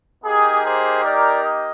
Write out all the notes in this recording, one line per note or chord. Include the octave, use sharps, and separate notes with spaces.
A#3 D#4 G4 G#4
G#4 C5
A#4 D5
D#5